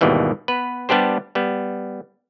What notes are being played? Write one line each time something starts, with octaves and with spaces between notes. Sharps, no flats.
G#1 D#2 B2 E3 G3
B3 B4
G3 B3 D4 G4 C5
G3 B3